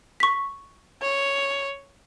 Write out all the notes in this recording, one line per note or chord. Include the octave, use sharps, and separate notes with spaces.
C#6 B6
C#5